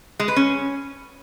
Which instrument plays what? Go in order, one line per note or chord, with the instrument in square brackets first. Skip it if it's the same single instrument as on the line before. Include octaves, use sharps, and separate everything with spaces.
[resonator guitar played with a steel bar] G#3
B4
C#4